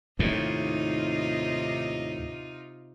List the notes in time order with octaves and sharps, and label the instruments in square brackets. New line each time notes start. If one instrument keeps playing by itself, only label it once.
[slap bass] D#2 A2 [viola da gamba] C3 D#4 F4